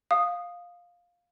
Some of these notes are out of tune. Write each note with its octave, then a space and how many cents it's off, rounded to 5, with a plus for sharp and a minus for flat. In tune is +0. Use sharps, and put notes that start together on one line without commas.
F5 +10 D#6 -10